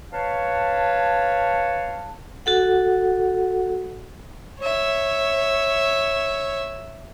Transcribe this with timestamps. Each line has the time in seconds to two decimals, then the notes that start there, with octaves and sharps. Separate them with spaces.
0.13 B4 C#5 F5 A5
2.46 F#4 A4 F#5
4.59 C#5 E5